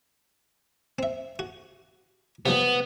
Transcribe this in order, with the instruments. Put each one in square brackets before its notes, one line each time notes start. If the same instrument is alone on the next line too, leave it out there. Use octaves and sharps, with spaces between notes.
[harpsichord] C4 E5
F#4
[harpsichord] C3 F3 G3 [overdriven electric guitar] B3